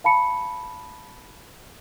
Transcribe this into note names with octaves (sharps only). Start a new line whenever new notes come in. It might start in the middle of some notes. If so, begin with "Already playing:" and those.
F5 A5 B5 C#7